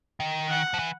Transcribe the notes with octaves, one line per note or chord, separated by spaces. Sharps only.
D#3
F#5
F3
E3